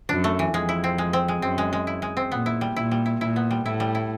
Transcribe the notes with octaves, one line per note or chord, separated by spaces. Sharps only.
F#2 D4
A3
E3
F2 G#3
E4
C4
G#3
C4
G#3
F#2 C4
G#3
G#3
E4
G#3
C4
A#2 B3
E4
G3
A#2 E4
G3
E4
A#2 E4
B3
G3
A2 E4
G3
E4